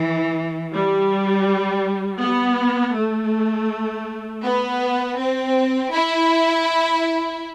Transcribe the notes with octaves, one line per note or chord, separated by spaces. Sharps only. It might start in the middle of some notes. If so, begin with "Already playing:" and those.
Already playing: E3
G3
B3
A3
B3
C4
E4